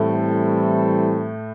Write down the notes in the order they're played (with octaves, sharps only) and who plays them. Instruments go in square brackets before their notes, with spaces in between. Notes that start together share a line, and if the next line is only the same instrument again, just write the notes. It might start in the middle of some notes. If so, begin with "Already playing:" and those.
Already playing: [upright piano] A2 A3 [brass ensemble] E3 G3 C4 E4 A4